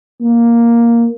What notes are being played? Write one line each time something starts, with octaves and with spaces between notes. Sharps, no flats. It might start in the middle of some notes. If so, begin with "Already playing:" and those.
A#3